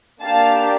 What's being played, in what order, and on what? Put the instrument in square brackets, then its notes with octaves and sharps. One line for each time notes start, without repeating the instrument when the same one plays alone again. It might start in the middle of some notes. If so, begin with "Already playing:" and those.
[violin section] A#3 D4 G4 F5 A5